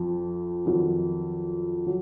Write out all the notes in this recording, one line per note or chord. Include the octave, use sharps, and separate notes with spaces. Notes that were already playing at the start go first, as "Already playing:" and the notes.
Already playing: F2 F3
F2 D#3 F#3
F#3